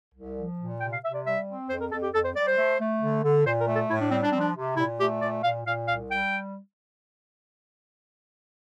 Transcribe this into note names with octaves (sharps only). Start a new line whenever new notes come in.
C2
F3
A#2
C3 G5
F5
C3 E5
D5
G3 E5
C4
F2 C5
A#4
F2 A4
G4
F2 A4
C5
G3 D5
C5
A3
A3
D3
D3
A#2 C5
A#4
A3
A4
A2 E4
D4
G3 C4
D4
F3 C4
D4
C3
A#2 E4
A3 G4
A#2 D5
A#2 F5
A#2 F5
C2 F5
G3 G5